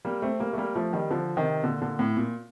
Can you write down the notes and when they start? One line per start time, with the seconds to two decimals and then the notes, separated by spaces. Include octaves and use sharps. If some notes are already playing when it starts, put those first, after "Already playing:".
0.05 G3 A#3
0.22 A3 C4
0.40 G3 A#3
0.53 A3
0.58 G3 A#3
0.75 F3 A3
0.93 D#3 G3
1.11 D3 F3
1.37 C3 D#3
1.64 A#2 D3
1.82 A#2 D3
1.99 A2
2.17 A#2